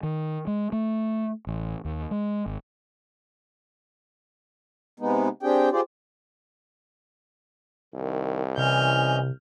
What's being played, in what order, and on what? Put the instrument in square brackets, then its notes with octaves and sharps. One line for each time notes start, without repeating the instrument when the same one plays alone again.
[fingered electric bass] D#3
G#3
A3
A1
D#2
G#3
G#1
[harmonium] C3 G#3 B3 D#4
C4 D4 G4 G#4 G5
F4 G4 G#4 C5 D5
[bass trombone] C2 [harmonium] D#3
[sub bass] C3 [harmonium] E3 C#4 D#5 [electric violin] F6 G6